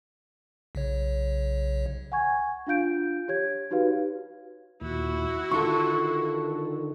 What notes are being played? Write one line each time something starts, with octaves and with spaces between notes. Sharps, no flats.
B1 C#3 C#5
F#5 G#5 C#6 G#6
D4 F4 F5 G6 D7
G4 C#5 G#6
D#4 F#4 G4 B4 F5
D#2 A#2 E4 F#4
D3 D#3 F4 A4 C#6